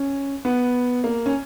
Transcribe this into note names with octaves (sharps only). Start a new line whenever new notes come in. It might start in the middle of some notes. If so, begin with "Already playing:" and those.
Already playing: C#4
B3
A#3
C#4